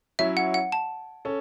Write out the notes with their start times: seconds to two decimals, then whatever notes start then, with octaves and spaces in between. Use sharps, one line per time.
0.19 F#3 C#4 E4 E5
0.37 F#5
0.54 F#5
0.72 A5
1.25 C#4 A4